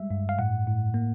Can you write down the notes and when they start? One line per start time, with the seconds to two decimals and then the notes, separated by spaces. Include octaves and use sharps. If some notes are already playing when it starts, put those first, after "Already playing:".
Already playing: G3 G#3 E5
0.11 G2
0.29 F5
0.39 A2 F#5
0.67 A2
0.94 A#3